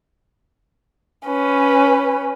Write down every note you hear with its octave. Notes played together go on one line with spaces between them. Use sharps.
C#4 B4